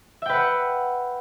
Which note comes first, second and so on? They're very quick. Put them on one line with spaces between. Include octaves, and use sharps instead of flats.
E5 G5 B4 F#5